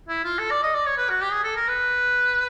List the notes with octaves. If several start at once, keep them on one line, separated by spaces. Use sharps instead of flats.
E4
F4
A4
D5
D#5
D5
C#5
B4
F#4
G4
G#4
A4
A#4
B4